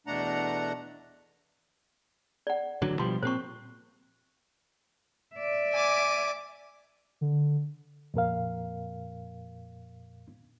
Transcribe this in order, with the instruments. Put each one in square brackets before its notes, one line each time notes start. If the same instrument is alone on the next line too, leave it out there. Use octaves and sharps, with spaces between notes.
[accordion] E2 B2 A3 D4 F#5 A#5
[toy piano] D5 F#5
[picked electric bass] A1 D3 F#3
[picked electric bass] B2 F3 G3 [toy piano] C6
[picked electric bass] A#2 C4 [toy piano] C5 C#6
[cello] D5 E5
[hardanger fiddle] G#5 D6
[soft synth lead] D3
[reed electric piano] F2 A#2 A#4 F5